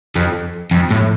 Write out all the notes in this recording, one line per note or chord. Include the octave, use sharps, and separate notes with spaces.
F2
F2
A2